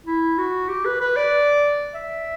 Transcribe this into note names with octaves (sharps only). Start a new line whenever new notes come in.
E4
F#4
G4
B4
B4
D5
E5